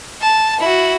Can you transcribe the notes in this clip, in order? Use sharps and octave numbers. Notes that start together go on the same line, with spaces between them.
A5
E4 F#4